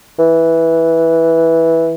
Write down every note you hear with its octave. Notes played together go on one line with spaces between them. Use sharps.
E3